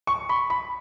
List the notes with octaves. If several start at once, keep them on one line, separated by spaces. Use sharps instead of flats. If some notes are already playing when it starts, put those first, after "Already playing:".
C#6
B5
B5